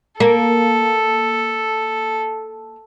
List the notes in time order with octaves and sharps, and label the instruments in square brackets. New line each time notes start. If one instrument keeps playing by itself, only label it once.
[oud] A#3 [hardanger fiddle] A4